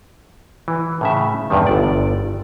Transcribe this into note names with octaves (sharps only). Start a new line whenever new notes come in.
E3
A2 C#3 E5
E2 G2 C3 D#3
G1 D5